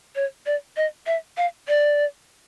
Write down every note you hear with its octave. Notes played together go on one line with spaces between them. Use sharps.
C#5
D5
D#5
E5
F5
D5